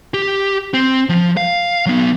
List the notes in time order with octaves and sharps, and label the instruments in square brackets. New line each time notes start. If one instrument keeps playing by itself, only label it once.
[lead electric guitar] G4
C4
F3
F5
F#3 B3